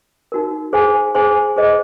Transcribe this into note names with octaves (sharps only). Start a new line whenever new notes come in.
D#4 F#4 A#4
G#4 C5 F5 G#5 C6
G#4 C5 F5 G#5 C6
G#4 C5 D#5